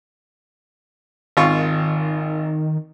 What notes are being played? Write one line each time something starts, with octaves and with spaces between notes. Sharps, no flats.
G#1 D#3 F4 C#6